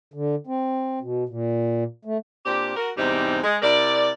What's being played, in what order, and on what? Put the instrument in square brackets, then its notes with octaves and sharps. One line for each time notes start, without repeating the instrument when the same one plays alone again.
[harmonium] D3
C4
B2
A#2
A3
[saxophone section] A#2 C4 D4 G4
F#4 A#4
E2 G#2 C3 G3 C4 D#4
G#3
C3 E4 A#4 D5